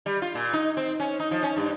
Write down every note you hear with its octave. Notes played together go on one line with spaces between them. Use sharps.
G3
F4
A#2
D#4
C4
C#4
D#4
F3
C#4
G2